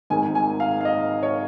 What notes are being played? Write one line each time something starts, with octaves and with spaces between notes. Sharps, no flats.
G#1 G#2 D#3 G#5
G#5
F5
F5
D#5
C#5